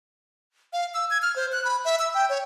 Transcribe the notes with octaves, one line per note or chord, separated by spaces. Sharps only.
F5
E6
G#6
F6
C5
F#6
B5
E5
E6
G5
C#5